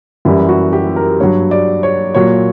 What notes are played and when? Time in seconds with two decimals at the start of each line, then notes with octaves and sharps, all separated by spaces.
0.25 F#2 E3 G3 E4
0.49 F#4
0.73 G4
0.96 A#4
1.20 G2 F#3 C#5
1.51 D5
1.83 C#5
2.15 A#2 F#3 C#5